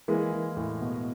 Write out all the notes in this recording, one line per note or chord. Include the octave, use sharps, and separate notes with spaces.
E3 G#3 A#3
E3
A2
B2